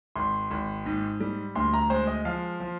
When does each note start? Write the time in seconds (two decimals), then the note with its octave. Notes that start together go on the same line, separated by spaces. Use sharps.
0.16 G#1 C6
0.51 G#1
0.86 G#2
1.20 G3
1.55 D2 C6
1.73 A#5
1.90 G#3 C5
2.07 D#5
2.25 F3 F5
2.60 F3